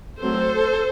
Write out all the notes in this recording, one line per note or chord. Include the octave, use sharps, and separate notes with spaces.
F#3 A3 C4 A4 C5